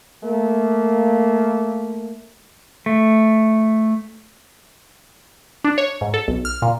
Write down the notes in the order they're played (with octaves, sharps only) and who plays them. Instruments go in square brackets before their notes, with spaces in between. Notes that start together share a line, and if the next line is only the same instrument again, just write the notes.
[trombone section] A3 A#3
[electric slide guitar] A3
[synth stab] D4
C#5
G#2
A4
B1
F6
A#2